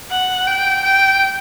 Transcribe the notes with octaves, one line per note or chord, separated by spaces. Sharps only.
F#5
G5
G5